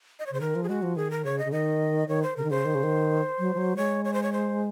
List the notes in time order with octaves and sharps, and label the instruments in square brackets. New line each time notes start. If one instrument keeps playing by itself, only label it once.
[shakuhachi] D#5
C#5
[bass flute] C#3 [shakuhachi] C5
[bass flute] D#3 [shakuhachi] A#4
[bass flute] F3
[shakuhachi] G#4
[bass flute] G#3 [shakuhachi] F#4
[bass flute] F3
[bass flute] D#3 [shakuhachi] G#4
[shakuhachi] A#4
[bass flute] C#3 [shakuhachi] C#5
[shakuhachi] D#5
[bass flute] C#3
[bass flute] D#3 [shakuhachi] D#5
[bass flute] D#3 [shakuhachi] C#5
[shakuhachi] C5
[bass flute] C#3 [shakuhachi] A#4
[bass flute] D#3
[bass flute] C#3 [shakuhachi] C5
[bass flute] D#3
C#3
D#3
F#3
F3
F#3
[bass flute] G#3 [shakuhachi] C#5
[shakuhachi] C#5
C5
C#5
C5